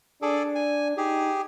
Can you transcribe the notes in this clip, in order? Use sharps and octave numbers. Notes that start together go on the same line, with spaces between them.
D4 G#4 A4 D5
G#5
D#4 G4 G#4